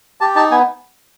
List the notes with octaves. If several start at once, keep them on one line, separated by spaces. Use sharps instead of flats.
G4 A5
D#4 A5
B3 G#5